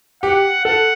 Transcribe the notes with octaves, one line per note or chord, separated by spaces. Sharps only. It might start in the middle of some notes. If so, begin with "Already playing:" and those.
G4 F#5
A4 F#5